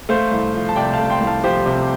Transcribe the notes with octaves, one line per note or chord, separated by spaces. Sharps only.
A3 C5 F5
C2
F3
A5
C3 D5 G5
F5 A5
A3
G5 C6
C2
F5 A5
F3 G4 C5
C3